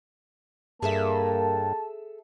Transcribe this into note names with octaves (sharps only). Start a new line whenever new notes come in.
G2 A#3 G#4 A4 E5 A5